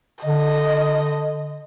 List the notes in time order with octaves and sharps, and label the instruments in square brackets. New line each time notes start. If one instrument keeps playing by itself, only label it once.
[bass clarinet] D3 [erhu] D#5